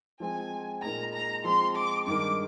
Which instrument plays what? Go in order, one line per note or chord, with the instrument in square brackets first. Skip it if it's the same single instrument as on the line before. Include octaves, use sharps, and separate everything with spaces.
[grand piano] F3 G#3 C4 [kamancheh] G#5
[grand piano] A#2 G#3 D#4 A#4 [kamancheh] A#5
[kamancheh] A#5
[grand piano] F3 G#3 C4 [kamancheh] C6
[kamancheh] D6
[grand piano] G2 D#3 G#3 D#4 A#4 [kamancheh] D6